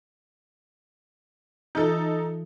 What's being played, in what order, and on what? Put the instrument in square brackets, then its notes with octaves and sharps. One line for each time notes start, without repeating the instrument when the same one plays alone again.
[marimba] E3 F4 [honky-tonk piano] D#4 A4